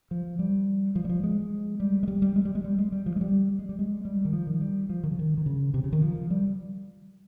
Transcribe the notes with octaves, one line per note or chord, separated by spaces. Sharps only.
F3
G3
F3
G3
F3
G#3
G3
G#3
G3
G3
G#3
G3
G#3
G3
G#3
G3
F3
G#3
G3
G#3
G3
G#3
G3
D#3
F3
D#3
G3
F3
D#3
C#3
D#3
D#3
C#3
C3
C#3
D#3
F3
G3